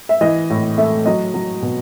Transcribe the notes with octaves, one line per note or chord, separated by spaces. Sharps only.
E5
E3 D#5
A2
A3 E5
F#3 D#5
F#3
B2